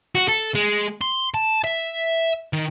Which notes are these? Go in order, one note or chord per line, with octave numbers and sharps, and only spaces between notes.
F#4
A4
G#3
C6
A5
E5
D#3